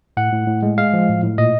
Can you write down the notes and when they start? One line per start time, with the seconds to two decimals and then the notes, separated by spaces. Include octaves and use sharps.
0.17 A2 F#5
0.33 A2
0.47 A2
0.63 G#3
0.77 G#3 F5
0.93 F3
1.09 A2
1.23 A2
1.38 A#2 D#5